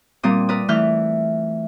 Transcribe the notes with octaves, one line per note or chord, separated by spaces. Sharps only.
A#2 G3 C4 D#6
A#4 B4 D5 D#6
E3 A3 E4 F6 G6